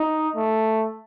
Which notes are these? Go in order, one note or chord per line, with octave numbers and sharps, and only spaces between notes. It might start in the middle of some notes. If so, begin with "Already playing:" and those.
Already playing: D#4
A3